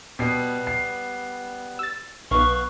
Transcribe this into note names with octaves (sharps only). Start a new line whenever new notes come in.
B2 G3 B3 C7
C7
E6 A6
B1 B3 F5 C#6